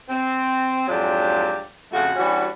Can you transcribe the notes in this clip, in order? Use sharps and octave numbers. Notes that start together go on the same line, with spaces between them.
C4
F2 G#2 F#3 D4 F4 G4
F2 C#3 A3 F4 F#4
E3 G3 C#4 D4 F#4